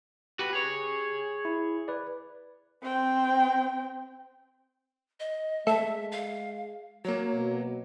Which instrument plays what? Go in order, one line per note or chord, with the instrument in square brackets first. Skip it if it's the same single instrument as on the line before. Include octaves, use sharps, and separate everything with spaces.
[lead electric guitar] F#4 B4 [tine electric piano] G4
[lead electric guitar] G#4 C#5
[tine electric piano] E4
B4 D5
[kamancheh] C4 G5
[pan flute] D#5
[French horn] G#3 [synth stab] A3 A4 [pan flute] E5
[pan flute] F5
[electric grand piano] F#3 A#3 [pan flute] C#5
[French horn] B2